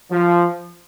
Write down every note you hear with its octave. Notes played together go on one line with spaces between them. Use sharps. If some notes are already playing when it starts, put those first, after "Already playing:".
F3